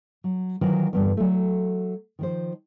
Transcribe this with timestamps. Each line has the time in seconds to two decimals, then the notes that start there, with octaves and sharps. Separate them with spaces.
0.24 F#3
0.61 D#3 E3 F#3 F4
0.93 E2 G2 D3
1.17 F#3 A3
2.19 D#3 F3 C5